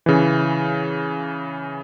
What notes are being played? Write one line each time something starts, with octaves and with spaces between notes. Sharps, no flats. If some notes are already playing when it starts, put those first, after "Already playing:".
C#3 E3